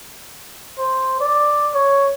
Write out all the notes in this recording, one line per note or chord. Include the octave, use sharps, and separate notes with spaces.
C5
D5
C#5